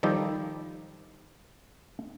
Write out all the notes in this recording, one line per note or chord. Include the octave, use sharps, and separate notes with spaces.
D#3 F3 G3 D#4 G4 A4